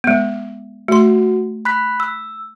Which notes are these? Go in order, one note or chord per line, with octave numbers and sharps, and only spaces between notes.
G#3 B3
A3 F#4 C6
B5 F#6 B6
E6